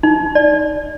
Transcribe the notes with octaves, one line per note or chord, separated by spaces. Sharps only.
D#4
D5